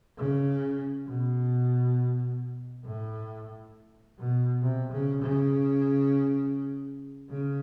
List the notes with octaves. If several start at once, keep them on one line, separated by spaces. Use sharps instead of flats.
C#3
B2
A2
B2
C3
C#3
C#3
C#3